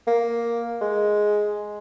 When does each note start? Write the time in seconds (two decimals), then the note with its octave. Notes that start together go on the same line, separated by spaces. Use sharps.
0.07 A#3
0.81 G#3